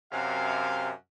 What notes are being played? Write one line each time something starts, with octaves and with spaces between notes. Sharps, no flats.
F#2 C3 F5